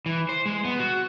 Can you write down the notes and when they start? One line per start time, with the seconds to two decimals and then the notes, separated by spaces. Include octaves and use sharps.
0.06 E3
0.29 C5
0.46 G#3
0.65 B3
0.79 F#4